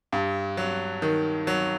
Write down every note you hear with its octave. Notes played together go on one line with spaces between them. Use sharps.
G2
F#3
D#3
F#3